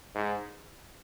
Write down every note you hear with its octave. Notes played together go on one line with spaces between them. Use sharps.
G#2